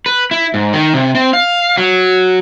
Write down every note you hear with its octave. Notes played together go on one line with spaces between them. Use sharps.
B4
E4
G#2
D#3
C3
C4
F5
F#3